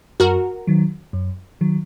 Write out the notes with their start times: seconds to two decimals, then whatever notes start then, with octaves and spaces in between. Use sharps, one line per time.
0.20 F#2 F#4 A#4
0.67 D#3 F#3
1.13 F#2
1.61 D#3 F#3